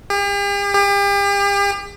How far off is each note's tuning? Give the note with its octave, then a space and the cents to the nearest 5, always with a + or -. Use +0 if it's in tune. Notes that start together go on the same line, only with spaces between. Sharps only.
G4 +45
G4 +40